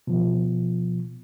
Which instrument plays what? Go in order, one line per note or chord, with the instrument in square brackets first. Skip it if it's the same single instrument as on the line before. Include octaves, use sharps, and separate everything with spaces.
[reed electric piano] B2 F3